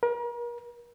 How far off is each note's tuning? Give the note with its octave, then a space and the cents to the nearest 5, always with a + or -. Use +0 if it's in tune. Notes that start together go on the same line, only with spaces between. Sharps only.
A#4 +40